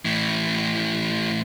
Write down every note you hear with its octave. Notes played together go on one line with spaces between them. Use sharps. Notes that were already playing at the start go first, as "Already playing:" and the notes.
A2 E3